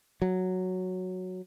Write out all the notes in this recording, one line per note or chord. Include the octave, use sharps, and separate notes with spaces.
F#3